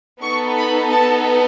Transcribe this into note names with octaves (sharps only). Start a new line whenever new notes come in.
B3 D#4 A4 C#6
B5
A5